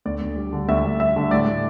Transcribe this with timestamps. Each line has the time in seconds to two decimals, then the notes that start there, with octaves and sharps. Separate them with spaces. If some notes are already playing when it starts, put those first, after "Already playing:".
0.05 D2 D5
0.21 D2
0.36 G3
0.53 D3
0.68 D2 E5
0.84 D2
1.00 G3 E5
1.16 D3
1.31 A2 D5
1.47 A2